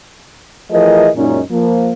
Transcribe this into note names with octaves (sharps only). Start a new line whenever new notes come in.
E3 F3 A3 G#4 A#4 D#5
F#2 A#2 G#3 C#4 D#4
F3 A#3